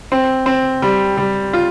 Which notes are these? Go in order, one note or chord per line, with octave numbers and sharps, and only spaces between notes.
C4
C4
G3
G3
F4